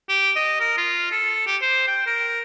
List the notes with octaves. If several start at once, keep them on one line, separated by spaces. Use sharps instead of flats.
G4
D#5
A#4
F4
A4
G4
C5
G5
A#4